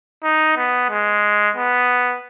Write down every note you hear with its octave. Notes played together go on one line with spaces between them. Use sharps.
D#4
B3
G#3
B3